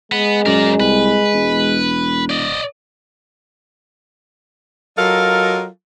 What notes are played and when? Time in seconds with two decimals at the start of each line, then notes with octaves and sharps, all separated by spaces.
0.12 G#3 B3
0.46 F#2 A#4 D5
0.80 C2 B4
1.33 E1
2.30 D5 D#5
4.97 F#3 F4 A4 A#4 D#5 F5